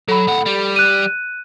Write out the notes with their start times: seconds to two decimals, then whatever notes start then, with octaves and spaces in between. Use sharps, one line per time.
0.08 F#3 A4 B5
0.27 A2 F#5
0.46 G3
0.76 F#6 D#7